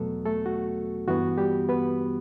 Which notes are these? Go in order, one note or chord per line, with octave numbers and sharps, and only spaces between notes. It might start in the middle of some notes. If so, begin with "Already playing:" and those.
Already playing: E2 B2 F#3 A3 B3 A4
A3 A4
F#4
G2 E3 B3 F#4
G3 G4
B3 B4